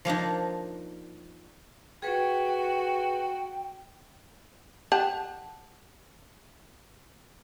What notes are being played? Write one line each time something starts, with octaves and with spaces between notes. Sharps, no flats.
F3 A#3 D4 D#4
F#4 G#4 B4 G5
G4 F#5 A5